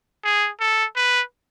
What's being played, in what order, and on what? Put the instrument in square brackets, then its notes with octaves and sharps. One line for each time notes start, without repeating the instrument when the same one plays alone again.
[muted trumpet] G#4
A4
B4